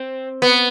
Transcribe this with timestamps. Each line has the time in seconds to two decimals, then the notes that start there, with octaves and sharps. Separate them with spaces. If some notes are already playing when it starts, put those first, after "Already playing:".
Already playing: C4
0.42 B3